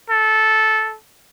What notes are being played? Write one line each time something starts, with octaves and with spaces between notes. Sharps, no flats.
A4